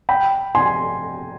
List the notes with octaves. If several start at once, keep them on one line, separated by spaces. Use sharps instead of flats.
G5 B5
G#5 C6